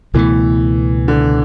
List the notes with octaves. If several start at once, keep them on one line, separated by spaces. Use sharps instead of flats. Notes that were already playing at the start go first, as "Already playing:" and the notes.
C#2 B2 E3 A3
D3